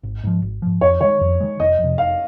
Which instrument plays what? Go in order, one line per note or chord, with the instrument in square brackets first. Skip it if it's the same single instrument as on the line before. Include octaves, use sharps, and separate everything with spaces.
[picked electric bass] G#1
G#2 F3
G#1
G#2 F3
[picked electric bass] F2 [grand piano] C#5
[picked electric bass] D#3 G#3 [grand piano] C#5
[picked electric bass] F2
D#3 G#3
[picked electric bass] F1 [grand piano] D#5
[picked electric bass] F2 C3
[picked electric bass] F1 [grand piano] F5